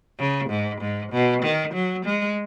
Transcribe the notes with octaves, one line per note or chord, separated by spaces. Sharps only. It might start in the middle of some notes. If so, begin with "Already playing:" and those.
C#3
G#2
G#2
B2
D#3
F#3
G#3